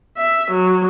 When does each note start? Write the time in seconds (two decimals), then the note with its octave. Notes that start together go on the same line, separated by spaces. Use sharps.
0.17 E5
0.51 F#3